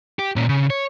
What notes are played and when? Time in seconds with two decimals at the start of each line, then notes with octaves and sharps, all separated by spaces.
0.19 G4
0.36 A#2 C#4
0.49 C#3
0.70 C#5